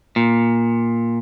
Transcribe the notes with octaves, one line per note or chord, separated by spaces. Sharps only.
A#2